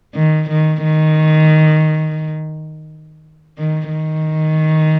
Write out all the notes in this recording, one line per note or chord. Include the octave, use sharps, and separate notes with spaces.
D#3
D#3
D#3
D#3
D#3